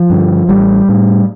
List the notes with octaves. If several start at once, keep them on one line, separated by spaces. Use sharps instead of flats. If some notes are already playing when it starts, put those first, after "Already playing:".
Already playing: F3
G2 D3
A1 G3
A2